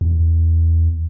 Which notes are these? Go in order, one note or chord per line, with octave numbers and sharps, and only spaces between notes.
E2